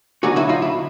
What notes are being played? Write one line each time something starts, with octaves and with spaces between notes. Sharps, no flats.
D3 F#3 B3 D#4 F#4 G#4
E4 F#4
D#4 F4
E4